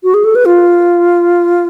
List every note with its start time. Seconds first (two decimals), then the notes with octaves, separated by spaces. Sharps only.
0.04 F#4
0.14 G#4
0.24 A4
0.35 B4
0.45 F4